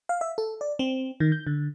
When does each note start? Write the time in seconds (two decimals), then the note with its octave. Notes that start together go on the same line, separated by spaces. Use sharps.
0.09 F5
0.21 E5
0.38 A4
0.61 D5
0.79 C4
1.20 D#3
1.32 G6
1.47 D3